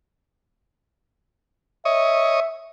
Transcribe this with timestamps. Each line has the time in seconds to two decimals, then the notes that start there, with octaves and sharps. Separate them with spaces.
1.85 C#5 D#5 E5